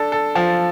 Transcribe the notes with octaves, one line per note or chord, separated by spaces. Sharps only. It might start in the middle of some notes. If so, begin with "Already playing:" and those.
Already playing: D4 A4
A4
F3